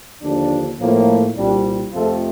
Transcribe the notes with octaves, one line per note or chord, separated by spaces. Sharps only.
D#2 D3 F3 D4
A2 F3 A#3
C2 A#2 G3 C4 D4
F2 C3 F3 A3 C4 F4 A4